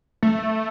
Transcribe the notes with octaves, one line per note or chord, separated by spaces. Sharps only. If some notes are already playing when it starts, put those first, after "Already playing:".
A3